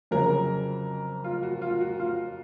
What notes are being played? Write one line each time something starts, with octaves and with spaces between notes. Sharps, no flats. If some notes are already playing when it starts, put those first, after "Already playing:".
F2 C#3 F#3 A#4
F4
F#4
F4
F#4
F4